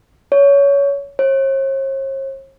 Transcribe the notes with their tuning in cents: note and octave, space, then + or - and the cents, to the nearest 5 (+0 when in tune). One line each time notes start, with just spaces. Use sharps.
C#5 +20
C#5 -45